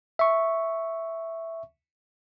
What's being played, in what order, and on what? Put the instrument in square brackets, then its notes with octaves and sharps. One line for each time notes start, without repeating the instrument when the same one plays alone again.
[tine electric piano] E5 C#6